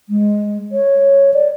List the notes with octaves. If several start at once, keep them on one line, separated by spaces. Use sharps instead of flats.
G#3
C#5
D5